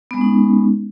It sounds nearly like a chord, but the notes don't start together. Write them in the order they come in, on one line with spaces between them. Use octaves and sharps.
B3 G#3 C#4 D#4